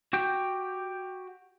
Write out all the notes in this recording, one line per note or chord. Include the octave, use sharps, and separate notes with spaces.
F#4 G4 G5